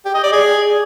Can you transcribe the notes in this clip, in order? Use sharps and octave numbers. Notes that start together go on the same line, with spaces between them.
G4
D#5
D5
G#4